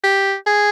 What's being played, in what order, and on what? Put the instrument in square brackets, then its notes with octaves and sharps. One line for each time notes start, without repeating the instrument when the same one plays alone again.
[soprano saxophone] G4
G#4